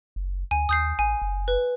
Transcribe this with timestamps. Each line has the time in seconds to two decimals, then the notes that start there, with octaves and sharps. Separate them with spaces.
0.16 F#1
0.51 D2 G#5
0.69 D#2 D#6 G6 C7
0.99 A1 G#5
1.22 F#1
1.48 B4